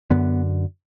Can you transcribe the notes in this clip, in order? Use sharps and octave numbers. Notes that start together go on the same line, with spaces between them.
F#2 D3 B3